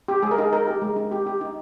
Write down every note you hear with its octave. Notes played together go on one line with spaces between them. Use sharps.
G4
G#3 G#4
A#4
D#4 G#4
D#4 A#4
G4
G#3
D#4
G4
G4
D#4